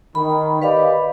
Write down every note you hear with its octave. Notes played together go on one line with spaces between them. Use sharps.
D#3 B5
G4 B4 D5 D#5 F5 B5